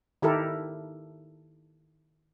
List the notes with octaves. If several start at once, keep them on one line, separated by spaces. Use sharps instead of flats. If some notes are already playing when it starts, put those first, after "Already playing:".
D#3 E4 G4 A4 A#4